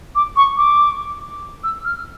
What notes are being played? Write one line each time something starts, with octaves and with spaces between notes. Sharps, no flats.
D6
C#6
D6
E6
F6